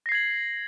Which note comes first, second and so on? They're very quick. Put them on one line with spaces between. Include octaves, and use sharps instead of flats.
A#6 C7 G#6 F#7